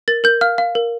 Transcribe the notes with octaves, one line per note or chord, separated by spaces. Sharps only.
A#4 A6
A#4 G6
F5 F6
F5
A#4